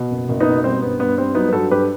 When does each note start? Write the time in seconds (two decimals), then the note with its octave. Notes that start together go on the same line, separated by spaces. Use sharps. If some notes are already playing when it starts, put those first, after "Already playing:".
Already playing: B2
0.11 F#1
0.29 F#1
0.40 B3 D#4
0.47 B2
0.64 G3 C4
0.82 G2 B3
0.99 G2 B3
1.18 G3 C4
1.35 F#3 B3 D#4
1.49 B4
1.52 G2 F#4 A4
1.71 G2 G4 B4